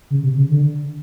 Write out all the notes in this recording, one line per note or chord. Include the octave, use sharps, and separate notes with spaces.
C#3
C3
C#3
D3